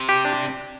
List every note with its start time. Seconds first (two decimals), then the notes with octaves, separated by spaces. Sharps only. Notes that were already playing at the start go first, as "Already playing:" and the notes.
Already playing: C3
0.09 G4
0.25 D4